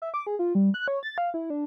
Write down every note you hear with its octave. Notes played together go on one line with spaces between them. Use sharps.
E5
D6
G#4
F4
G3
F#6
C#5
A6
F5
E4
D4